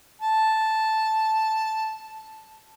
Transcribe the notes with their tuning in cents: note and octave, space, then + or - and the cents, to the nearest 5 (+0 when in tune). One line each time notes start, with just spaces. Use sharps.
A5 -5